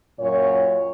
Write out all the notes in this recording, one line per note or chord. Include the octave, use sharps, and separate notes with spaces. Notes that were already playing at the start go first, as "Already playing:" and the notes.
F#2 A#2 C#5